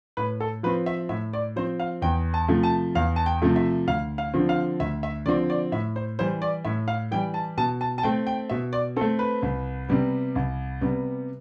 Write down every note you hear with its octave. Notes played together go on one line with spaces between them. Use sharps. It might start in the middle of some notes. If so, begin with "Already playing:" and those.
A2 B4
A4
F3 C4 B4
E5
A2 E5
D5
F3 C4 C5
F5
E2 G5
A5
C3 F3 A3
A5
E2 F5
A5
G5
C3 F3 A3
E5
D2 F5
F5
D3 F3 C4
F5
D2 E5
E5
D3 F3 C4 D5
D5
A2 E5
C5
E3 G3 C5
D5
A2 E5
F5
E3 G3 G5
A5
B2 A5
A5
A5
A3 C4 G5
G5
B2 E5
D5
A3 C4 A4
B4
C2
C3 G3 B3
C2
C3 G3 B3